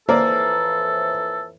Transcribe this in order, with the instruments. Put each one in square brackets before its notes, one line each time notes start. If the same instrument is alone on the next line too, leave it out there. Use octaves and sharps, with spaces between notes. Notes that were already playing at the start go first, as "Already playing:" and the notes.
[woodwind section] F2 A2 E3 [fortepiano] A#3 D5 [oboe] A4 [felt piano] C5